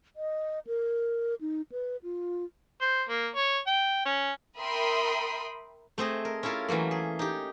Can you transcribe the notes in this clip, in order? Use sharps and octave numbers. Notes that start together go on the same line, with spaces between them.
D#5
A#4
D#4
B4
F4
C5
A#3
C#5
G5
C#4
A#4 E5 G5 B5 C6 D#6
A3 C4 G#4 D#5
A#4
C#4 E4 F4 A4 A#4
E3 F#3 A3 A#3
G#4
D#4 G4